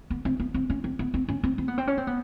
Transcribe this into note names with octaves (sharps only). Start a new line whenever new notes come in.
B3
C4
B3
C4
C#4
C4
B3
C4
C#4
C4
C4
B3
C4
C#4
C4
B3